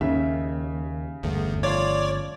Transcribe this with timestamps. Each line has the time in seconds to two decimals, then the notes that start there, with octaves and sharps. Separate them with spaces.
0.01 D#2 C#3 E5
1.23 G1 E2 A3
1.63 F3 C#5 D5 C6 D6